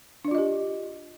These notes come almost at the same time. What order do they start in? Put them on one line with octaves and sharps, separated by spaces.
D4 D5 F4 D#5 G4